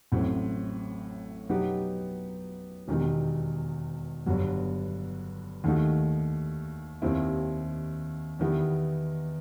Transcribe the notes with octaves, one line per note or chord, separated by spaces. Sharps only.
A1 A2 F#3 C4
B2 F#3 B3 D#4 G4
E1 E2 D#3 G3 D#4
G1 G2 F#3
D#2 D#3 A3 D#4 F#4
D#2 D#3 G3 C4 E4
E2 D#3 G3 B3 E4